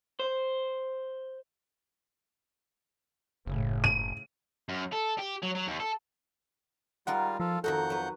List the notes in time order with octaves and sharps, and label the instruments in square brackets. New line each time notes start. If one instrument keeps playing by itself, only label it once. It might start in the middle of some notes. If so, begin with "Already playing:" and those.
[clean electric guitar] C5
[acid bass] F#1 [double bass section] A2 C#3
[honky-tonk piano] D#7
[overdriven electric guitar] F#2
A4
G4
F#3
F#3
D#2
A4
[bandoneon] G3 F4 [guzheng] G#3 D#4 A#4 [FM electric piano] F#5
[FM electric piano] F3 [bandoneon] F4 A4
[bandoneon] F2 F#5 G6 [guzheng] D#3 D#4 F#4 [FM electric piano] A4
[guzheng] F#3 B4